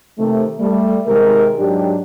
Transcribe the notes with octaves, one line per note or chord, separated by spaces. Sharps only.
C3 D#3 A3
G3 A3
C3 D#3 G#3 G4 A#4
G#2 F#3 D4 G4